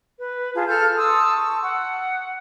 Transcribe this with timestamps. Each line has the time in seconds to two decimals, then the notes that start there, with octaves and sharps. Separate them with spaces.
0.18 B4
0.55 F4 G#4 A5
0.68 A4 A5 F6 G6
0.97 A5 C6 D#6 E6
1.36 C#6
1.63 F#5